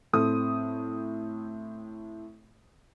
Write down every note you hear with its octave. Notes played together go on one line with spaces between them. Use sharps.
A2 C4 A4 D#6